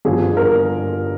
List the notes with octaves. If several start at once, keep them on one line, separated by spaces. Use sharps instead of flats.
G1 G2 D3 F3 G#4
A#4